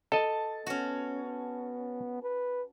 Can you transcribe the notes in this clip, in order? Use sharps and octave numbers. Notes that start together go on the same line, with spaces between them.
A4 D#5 A5
B3 C#4 F#4
B4